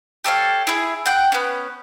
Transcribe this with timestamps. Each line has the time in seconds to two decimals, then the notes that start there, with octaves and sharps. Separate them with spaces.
0.24 G4 A4 C#5 F5
0.67 E4 G#4
1.06 F#5 G5
1.32 B3 C#4